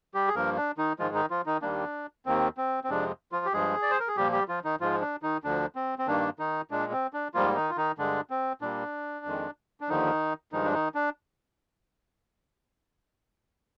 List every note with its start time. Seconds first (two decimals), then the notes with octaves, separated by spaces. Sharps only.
0.14 G3 G4
0.28 G#4
0.35 G2 F3 A#3 A#4
0.57 D4
0.78 D#3 D#4
0.99 G#2 D#3 F3 G#3 F4
1.15 D#3 D#4
1.30 F3 F4
1.46 D#3 D#4
1.62 D#2 D#3 G3 A#3 D4
2.26 D#2 D#3 A#3 C4
2.57 C4
2.84 C4
2.90 F2 C3 F3 G#3 D4
3.32 F3 F4
3.45 G4
3.53 G2 F3 G#3 G#4
3.82 D5
3.91 C5
4.00 A#4
4.08 G#4
4.17 A#2 F3 G3 A#3 G4
4.32 G3 G4
4.48 F3 F4
4.64 D#3 D#4
4.80 G#2 F3 G#3 F4
5.01 D4
5.23 D#3 D#4
5.44 D2 D3 F3 D4
5.75 C4
5.99 C4
6.07 G2 D#3 A#3 D4
6.39 D#3 D#4
6.71 A#2 G#3 D4
6.92 C4
7.13 D4
7.34 G#2 F3 G3 A#3 F4
7.56 D#3 D#4
7.70 F4
7.77 D#3 D#4
7.98 G2 D3 G#3 D4
8.30 C4
8.62 A#2 G3 A#3 D4
9.26 F2 D#3 G#3
9.81 D4
9.89 D#2 D3 D#3 F3 D#4
10.52 G2 D#3 F3 G#3 D#4
10.65 D4
10.74 D#3 D#4
10.95 D4